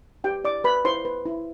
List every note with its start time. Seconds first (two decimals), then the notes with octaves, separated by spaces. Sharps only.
0.24 G4 B4 G5
0.44 E4 D5 D6
0.64 B4 B5
0.84 E4 C5 C6
1.05 B4
1.26 E4